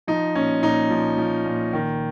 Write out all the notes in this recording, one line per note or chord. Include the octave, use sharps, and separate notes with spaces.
F3 D#4
A#2 C#4
A#2 D#4
F3
F3
A#2
D#3